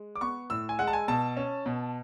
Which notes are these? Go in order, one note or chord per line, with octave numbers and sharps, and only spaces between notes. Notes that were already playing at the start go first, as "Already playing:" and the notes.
Already playing: G#3
D6
B3 C#6
A2 E6
G#5
G#3 F#5
A5
G#5
B2 A5
C#4
B2